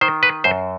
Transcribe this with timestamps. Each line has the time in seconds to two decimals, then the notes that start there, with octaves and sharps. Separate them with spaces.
0.01 D#3 C5
0.23 B4
0.44 F#2 C5